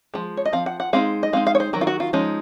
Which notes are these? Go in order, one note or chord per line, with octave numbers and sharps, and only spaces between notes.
F3 G#3
C#5
D#5
F3 C4 F5
F#5
F#5
G#3 C4 D#4 F5
D#5
G#3 C4 D#4 F5
F5
C#5
C5
D#3 F#3 A#4
F4
F#4
F4
F3 G#3 C#4 D#4